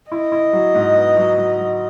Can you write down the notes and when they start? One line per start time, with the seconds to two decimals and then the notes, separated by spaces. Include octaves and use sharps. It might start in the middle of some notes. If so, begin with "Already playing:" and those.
0.11 E4 D#5
0.32 E4
0.53 F#3
0.75 G#2
0.95 B3
1.17 F#3
1.38 F#3
1.59 F#3